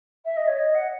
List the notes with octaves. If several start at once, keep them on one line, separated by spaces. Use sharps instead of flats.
E5
D#5
C#5
D#5
F#5